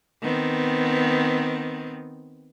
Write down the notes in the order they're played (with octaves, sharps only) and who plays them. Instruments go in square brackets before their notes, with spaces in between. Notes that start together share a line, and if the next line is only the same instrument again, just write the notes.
[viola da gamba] D#3 B3 C4